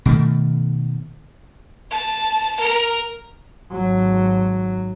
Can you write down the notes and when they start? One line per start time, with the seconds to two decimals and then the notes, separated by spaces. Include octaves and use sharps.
0.06 B2 D#3 A3
1.91 A5
2.60 A#4
3.72 G#1 F#3